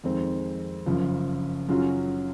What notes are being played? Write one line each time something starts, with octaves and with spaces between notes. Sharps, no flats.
F2 D#3 G#3 C4
F#1 F#2 F3
F#2 C#3 F#3 C#4 F4